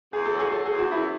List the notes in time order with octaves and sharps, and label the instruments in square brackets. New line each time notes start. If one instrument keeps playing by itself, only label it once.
[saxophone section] E2 [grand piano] G#4
[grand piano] A4
[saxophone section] F#3
[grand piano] G#4
[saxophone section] F#3 [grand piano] A4
[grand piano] G#4
[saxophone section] E2
[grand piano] F#4
[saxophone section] F#2 [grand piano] E4